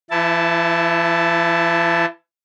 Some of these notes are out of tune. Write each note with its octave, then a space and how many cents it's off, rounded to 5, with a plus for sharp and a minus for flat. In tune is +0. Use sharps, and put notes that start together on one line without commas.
E3 +40 E4 +0 A5 +0